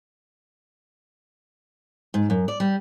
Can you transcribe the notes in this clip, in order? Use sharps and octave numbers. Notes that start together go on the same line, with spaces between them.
G#2
F#2
D5
G3